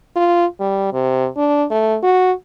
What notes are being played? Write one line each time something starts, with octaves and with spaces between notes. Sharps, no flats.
F4
G3
C3
D4
A3
F#4